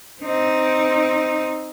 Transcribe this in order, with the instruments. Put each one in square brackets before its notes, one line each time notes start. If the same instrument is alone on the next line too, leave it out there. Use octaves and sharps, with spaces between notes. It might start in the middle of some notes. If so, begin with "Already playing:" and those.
[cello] C4 D#4